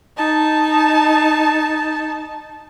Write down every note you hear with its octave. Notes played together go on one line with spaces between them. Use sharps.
D#4 A5